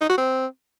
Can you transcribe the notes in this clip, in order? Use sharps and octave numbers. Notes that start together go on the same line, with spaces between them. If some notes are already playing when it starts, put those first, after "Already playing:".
D#4
F#4
C4